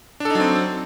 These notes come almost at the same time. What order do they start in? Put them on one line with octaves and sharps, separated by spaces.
D4 A4 D#4 F#3 C4